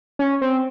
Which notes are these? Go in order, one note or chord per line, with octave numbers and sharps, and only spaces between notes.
C#4
C4